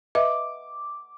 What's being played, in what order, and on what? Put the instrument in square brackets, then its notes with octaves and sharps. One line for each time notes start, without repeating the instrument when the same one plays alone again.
[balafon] B4 D#5 E5 [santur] D6